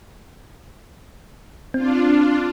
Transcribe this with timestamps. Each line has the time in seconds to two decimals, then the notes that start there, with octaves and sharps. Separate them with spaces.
1.74 C4 D4 F4